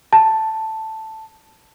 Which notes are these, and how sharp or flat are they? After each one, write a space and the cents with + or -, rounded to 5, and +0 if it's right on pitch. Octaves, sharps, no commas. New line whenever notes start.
A5 +0